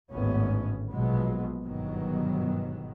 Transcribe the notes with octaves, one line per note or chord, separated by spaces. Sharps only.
G#1 D2 A2 B3 C#4
A#1 B2 F#3 G#3 B3
G1 G#2 B2 D#3 F#3 B3